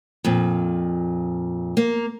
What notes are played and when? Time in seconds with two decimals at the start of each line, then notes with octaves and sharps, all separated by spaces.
0.24 F2 A#2
1.77 A#3